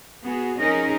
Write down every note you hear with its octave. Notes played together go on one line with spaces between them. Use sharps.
B3 F#4 G#4
F3 C#4 D#4 G#4 A#4 D#5